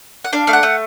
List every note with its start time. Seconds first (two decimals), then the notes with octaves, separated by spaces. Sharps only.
0.25 F#5
0.33 D4 F5
0.47 A3 F5
0.53 F#5
0.63 A3